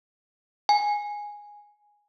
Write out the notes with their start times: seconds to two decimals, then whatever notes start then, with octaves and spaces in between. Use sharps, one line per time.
0.69 G#5